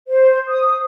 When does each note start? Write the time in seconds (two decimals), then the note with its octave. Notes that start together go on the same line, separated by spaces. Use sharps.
0.08 C5
0.49 D#6